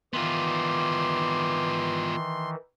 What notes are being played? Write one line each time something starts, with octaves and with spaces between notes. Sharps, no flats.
D#3 E3 G3 B3 F4 C6 D6